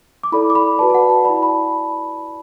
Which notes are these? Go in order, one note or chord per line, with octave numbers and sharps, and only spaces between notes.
D6
E4 A4 D5 B5
D6
B5
F#4 B4 D5 A5
A5
F#5
A5
E4 D5 B5
B5
A5